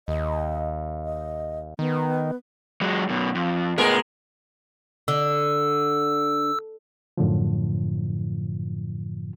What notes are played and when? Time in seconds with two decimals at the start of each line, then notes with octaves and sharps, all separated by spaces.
0.08 D#2 D#5
1.05 D#5
1.79 D#3 B3
2.81 F#3 G#3
3.09 F#2 B2
3.35 F2
3.78 A2 G#3 B3 A#4
5.08 D3 E6
7.17 F#2 A2 D3 F3